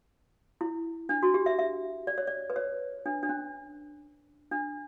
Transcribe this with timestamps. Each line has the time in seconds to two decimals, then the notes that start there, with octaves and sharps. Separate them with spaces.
0.61 E4
1.09 D4
1.23 F#4
1.34 G4
1.46 E5
1.59 E5
2.07 D5
2.18 C#5
2.27 D5
2.50 B4
2.56 C#5
3.06 D4
3.23 D4
3.29 C#4
4.51 D4